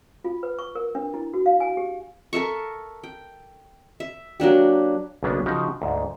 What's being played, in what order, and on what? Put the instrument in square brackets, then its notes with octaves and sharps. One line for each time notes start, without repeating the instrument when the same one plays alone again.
[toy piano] F4
B4
C#6
A#4
D4
E4
F#4
F5
G#5
G4
[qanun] A4 A#4 E5 C#6
G5
E5
F#3 A#3 D4 G4
[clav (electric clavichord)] B1 C#3 A#3 B3 D4
C#3 F3 D#4 F#4 G4
D2 G#2